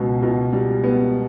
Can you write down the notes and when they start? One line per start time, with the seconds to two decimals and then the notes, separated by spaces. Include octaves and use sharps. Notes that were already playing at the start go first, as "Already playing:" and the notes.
Already playing: C#2 B2
0.23 B2
0.53 G3
0.84 B3